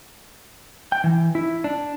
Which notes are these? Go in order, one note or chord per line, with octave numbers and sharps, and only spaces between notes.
G5
E3
E4
D4